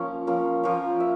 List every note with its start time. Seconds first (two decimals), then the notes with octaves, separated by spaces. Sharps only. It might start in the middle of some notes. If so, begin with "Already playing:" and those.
Already playing: F3 A#3 C#4
0.27 F3 A#3 C#4
0.63 F3 A#3 C#4
1.00 E5